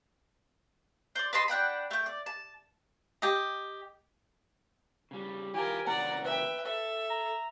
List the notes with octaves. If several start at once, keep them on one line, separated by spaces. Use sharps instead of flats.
C5 D5
B4 D#5 A5 C6
D4 F#5 G5 B5
A3 G5
D5
A5
G4 D#5
C#3 G3
E3 F4 G4 A#4 G#5
C#3 E3 A#3 D5 F#5 A#5
B4 E5 G5
A4 E5
A#5